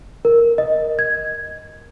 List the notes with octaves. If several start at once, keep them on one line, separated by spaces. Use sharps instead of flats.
A#4
D#5
G#6